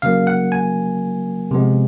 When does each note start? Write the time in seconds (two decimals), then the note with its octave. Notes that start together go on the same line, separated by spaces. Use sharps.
0.02 C#3 F#3 A#3 F5
0.27 F#5
0.52 G#5
1.51 C3 F3 G#3 B3